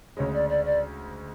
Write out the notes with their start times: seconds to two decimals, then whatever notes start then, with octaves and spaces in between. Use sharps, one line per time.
0.17 D2 C#3 G#3 C#5
0.33 D5
0.49 D5
0.64 D5